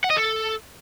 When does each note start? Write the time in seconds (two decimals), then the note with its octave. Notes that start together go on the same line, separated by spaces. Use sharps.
0.04 F#5
0.10 D#5
0.17 A4